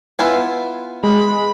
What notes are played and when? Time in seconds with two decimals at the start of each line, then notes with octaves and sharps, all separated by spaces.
0.19 B3 E4 F4 G#5
1.03 G#3 B5